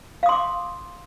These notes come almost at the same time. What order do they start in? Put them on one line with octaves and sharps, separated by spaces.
F5 D#6 C6 D6